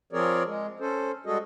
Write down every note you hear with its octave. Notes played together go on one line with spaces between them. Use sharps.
F3 C4 G#4 A#4 C#5 D5
G#3
C#4 A4 C5
G3 G#3 F#4 G#4 A4 D#5